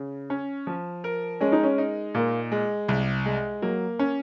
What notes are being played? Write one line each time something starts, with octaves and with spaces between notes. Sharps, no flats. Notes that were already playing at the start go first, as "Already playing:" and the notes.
Already playing: C#3
C#4
F3
A#4
G#3 C#4
D#4
C#4
D#4
A#2 A#3
G#3
C2
G#3
F#3 A#3
C#4